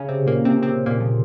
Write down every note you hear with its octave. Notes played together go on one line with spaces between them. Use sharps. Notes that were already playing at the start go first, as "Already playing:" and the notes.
Already playing: C#3 C#4
C3 C4
A#2 A#3
C3 C4
C3 C4
A#2 A#3
F3